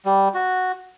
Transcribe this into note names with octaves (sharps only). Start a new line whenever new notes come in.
G3
F#4